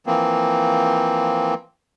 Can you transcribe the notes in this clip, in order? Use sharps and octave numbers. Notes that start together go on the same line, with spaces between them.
E3 F3 A#3 C4